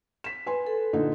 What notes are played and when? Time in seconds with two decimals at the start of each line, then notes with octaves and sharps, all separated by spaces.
0.24 B6 E7
0.46 B4 G#5 C6
0.66 A4
0.93 A#2 D3 D#4